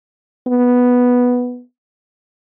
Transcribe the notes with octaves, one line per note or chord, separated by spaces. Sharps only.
B3